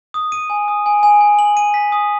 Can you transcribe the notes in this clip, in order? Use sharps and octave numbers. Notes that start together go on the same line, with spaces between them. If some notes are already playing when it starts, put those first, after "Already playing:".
D#6
D#7
G#5
D#6
G#5
G#5
G#5
F#7
D#7
B6
D#6